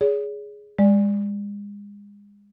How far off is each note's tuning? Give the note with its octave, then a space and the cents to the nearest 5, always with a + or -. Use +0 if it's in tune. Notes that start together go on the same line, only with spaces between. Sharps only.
G#4 +0 C#5 +40
G#3 -35 D5 +5